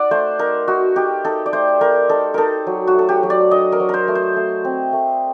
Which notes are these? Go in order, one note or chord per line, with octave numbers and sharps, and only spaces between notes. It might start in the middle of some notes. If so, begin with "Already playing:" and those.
Already playing: D#4 D5 F#5
A3 C5
D#4 A#4
D#4 F#4
D#4 G4
D#4 A4
D5
A3 C5
A3 A#4
D#4 A4
D#4 A4 A#4
F#3
F#4
A3 A4
G4
F#3
D5
D4 D#5
A#4
F#3
A#4 C5
A3
C5
A3
C4
A3